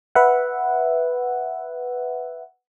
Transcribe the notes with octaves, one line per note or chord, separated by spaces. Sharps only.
B4 E5 F#5